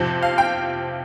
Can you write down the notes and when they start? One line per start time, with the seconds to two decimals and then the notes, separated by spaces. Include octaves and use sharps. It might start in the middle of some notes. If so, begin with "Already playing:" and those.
Already playing: F2 C3 F3
0.22 F5
0.38 G5